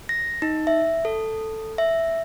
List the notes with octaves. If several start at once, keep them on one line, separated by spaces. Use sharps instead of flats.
A#6
D#4
E5
A4
E5